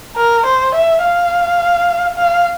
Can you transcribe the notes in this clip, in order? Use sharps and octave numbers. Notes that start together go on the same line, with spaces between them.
A#4
C5
E5
F5
F5